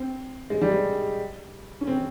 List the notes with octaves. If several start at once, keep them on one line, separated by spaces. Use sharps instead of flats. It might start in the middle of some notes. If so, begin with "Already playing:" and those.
Already playing: C4
G#3
G3
G#3
C#4
C4